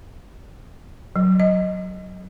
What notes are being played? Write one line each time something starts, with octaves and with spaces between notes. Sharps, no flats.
F#3
D#5